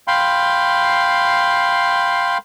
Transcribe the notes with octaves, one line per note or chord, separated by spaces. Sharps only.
F5 G5 B5 C6